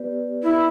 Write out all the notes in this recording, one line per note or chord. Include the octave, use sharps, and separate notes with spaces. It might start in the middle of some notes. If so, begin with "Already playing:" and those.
Already playing: B3 G4 B4 D5
E4